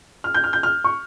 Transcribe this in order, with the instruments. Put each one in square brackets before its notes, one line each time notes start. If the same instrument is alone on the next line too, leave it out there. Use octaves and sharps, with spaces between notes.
[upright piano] F6
G6
F6
G6
F6
C#6